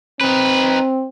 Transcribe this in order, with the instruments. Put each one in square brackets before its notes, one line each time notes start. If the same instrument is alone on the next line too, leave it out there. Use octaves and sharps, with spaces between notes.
[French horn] C4 [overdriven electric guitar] D#4 B4